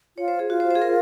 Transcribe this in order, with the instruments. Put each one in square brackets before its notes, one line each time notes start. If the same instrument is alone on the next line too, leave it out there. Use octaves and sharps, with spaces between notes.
[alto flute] F4 [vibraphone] C#5
[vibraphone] C5
G#4
[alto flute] F4 [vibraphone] F#4
[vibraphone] C5
G#4 C5
A#4